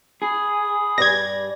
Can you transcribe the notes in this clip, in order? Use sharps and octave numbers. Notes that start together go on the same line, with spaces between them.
G#4 B5 D#6
G2 D5 G#6 A#6